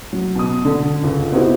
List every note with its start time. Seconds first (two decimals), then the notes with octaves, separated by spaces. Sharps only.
0.13 F#3
0.35 B2 D#6
0.65 D3
1.03 C#2
1.32 B3 C4 D#4 E4 F#4 G4